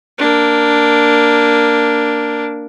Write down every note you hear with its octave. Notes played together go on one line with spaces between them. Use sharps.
A#3 D4